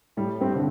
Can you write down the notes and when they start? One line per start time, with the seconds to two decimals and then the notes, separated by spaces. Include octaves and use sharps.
0.17 A2 G3
0.40 G2 C4 G4
0.55 D3